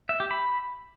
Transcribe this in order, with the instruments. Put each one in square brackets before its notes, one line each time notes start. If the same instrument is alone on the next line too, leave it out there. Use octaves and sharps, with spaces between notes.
[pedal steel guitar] E5
G4
B5